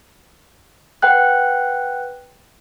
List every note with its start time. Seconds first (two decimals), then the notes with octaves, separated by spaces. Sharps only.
1.02 B4 F#5 G5 F#6